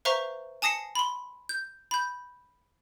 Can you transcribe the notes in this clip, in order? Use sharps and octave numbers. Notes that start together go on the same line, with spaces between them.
B4 C5 E5 F5 A#5 C#6
G#5 A5 D#6 A#6 C7 C#7
B5 C6
G6
B5 G6